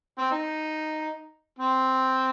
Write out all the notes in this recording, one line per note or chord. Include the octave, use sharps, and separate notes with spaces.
C4
D#4
C4